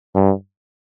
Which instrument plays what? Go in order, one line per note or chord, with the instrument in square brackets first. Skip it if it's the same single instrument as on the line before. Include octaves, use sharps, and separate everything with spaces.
[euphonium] G2